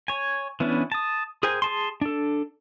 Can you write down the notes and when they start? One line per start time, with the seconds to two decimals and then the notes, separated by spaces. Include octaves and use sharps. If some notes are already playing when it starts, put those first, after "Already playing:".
0.08 C#5 G#5
0.60 E3 B3 C#4 D4 E4
0.92 A5 D#6
1.43 G#4 A#4 C5 G5 G#5
1.62 G#4 A5 C6
2.01 D4 A4